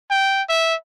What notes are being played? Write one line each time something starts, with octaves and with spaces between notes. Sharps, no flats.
G5
E5